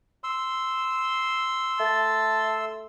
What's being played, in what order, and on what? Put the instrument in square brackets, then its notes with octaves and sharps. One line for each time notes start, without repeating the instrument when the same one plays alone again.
[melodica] C6 E6
[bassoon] A3 [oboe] A5